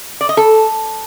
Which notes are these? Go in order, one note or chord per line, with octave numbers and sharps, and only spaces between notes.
D5
D#5
A4